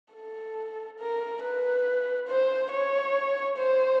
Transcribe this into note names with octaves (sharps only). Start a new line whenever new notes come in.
A4
A#4
B4
C5
C#5
C5